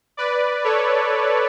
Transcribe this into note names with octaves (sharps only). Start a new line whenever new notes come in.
B4 D5
A4 C#5